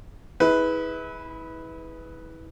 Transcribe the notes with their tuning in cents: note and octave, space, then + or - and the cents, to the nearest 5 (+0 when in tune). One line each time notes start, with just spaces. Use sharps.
E4 -35 G#4 +0 B4 +0